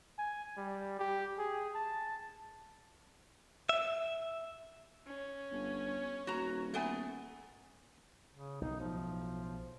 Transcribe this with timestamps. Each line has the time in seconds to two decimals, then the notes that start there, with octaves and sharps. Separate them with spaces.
0.18 G#5
0.57 G3
0.99 G4
1.38 G#4
1.75 A5
3.69 E5
5.07 C#4
5.52 G1
6.27 D#1 F#4 A#5
6.74 A3 B3 G#5
8.34 C#3
8.61 B1 A2 D#4
8.80 F3